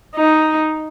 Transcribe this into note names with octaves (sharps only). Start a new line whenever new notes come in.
D#4